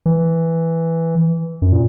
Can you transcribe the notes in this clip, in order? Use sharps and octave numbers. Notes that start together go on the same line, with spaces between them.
E3
F#2
A#2